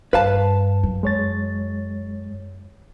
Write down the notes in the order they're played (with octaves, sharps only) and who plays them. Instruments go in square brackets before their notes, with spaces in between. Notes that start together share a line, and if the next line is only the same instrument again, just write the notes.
[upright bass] G2 [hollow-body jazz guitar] B4 F5 A5
[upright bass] F#2
[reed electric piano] G#3 C#5 A6